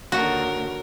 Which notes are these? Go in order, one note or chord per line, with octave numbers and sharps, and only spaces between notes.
D#2 D3 F#4 A#4 C#5